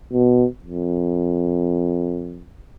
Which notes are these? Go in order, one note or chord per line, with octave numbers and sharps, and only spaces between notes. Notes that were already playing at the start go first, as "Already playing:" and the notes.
B2
F2